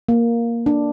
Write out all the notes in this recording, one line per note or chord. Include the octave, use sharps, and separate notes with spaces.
A#3
D4